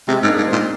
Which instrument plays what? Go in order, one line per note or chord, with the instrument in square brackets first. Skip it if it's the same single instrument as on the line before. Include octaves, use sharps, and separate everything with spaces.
[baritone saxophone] C3 [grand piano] G#3 C4
[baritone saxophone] G#2
[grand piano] A#3 D4
[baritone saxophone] G#2
[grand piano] C4 D#4
[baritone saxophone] A#2